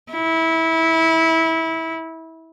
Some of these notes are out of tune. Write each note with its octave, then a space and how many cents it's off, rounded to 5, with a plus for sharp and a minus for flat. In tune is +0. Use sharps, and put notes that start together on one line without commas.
E4 -20